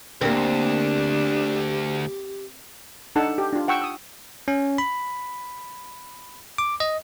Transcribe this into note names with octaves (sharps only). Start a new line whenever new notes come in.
D2 A#3 C4 D4 G4
D4 D#4 A4 F#5 A5
G4
D4 F4
F#5 G5 C#6 E6
D#6 E6
C#4
B5
D6
D#5